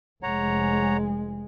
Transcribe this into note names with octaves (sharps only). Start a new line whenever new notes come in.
F1 G#3 C#5 F#5 A#5